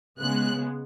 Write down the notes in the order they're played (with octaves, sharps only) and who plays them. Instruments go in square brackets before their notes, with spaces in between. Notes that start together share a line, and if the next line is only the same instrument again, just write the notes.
[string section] C#3 G#3 B3 F#6